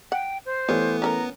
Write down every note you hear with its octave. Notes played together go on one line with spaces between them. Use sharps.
F#5 G5
C5
E3 G3 A3 B3 C#5
C#4 A4 A#4 A#5